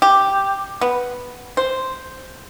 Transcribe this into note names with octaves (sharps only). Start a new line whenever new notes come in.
G4
B3
C5